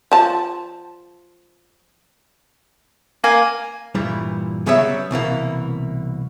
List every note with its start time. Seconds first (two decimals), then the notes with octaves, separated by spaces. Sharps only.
0.12 F3 A5
3.24 A#3 G#5
3.95 G2 A#2 E3 G3
4.66 C#3 F#3 G3 B3 C#5 E5
5.11 C2 B2 E3 A#3